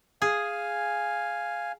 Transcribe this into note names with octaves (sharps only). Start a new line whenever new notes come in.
G#4 F5 G#5